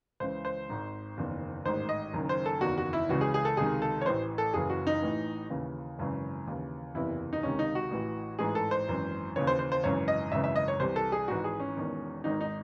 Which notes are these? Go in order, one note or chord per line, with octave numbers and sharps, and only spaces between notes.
C#2 C#3 E3 C5
C5
G#1 G#2 D#3
F#1 E2 D#3
A1 G#2 D#3 C5
D#5
F#1 F#2 D#3
C5
A4
F#1 E2 D#3 F#4
F#4
E4
C#2 C#3 E3 F#4
G#4
G#4
A4
C#2 C3 D#3 G#4
A4
C#5
A1 A2 E3 C5
A4
F#1 F#2 E3 G#4
F#4
D#4
A1 A2 E3
D#2 C#3 E3
G#1 F#2 C#3 E3
D#2 C#3 E3
F#1 E2 C3 E3 E4
D#4
C#2 C3 D#3 C#4
D#4
F#4
A1 A2 E3
A1 G#2 E3 G#4
A4
C5
G#1 F#2 E3
D#2 C#3 E3 C#5
C5
C5
C5
G#1 F#2 C#3 E3 C#5
D#5
G#1 F#2 C#3 E3 E5
E5
D#5
C#5
C2 C3 E3 C5
A4
G#4
G#1 G#2 E3 F#4
G#4
C#4
E1 E2 D#3
G#1 G#2 D#3 D#4
D#4